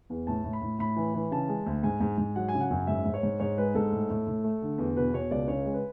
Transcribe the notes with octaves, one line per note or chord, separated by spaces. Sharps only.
E2
A2 A5
A2
B5
A2
A2 B5
E3
E3
C#3 A5
G#3
D2
G#2 G#5
G#2
G#2
F#3 F#5
G#5
C#3
F#5
F#2
G#2 E5
G#2
C#5
G#2
G#2 C#5
G#3 B4
G#2 A4
A2
A2
A2
A3
D3
E2
B2 B4
B2 C#5
C#2 D5
C#3 C#5
G#3
B4